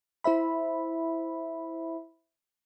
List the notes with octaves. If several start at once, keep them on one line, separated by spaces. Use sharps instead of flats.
E4 C5 E5 B5